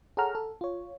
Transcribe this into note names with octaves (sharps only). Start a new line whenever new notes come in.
G#4 A4 C#5 F#5 A#5 F6
A4
F4 C#5